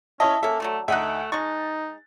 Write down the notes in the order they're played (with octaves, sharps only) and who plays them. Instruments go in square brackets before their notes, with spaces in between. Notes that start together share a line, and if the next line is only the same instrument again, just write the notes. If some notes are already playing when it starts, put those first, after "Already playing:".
[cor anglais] C#4 [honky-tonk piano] E4 C#5 E5 [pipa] D#5 [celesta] A5
[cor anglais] A#3 [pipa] C#4 E5 [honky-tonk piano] A4
[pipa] D3 F3 F#3 [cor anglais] A3
[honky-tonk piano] D2 F#5 F#6 [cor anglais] A3 [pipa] D#4 D#5 E5
[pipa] G#3 C#6 [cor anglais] D#4 [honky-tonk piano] A6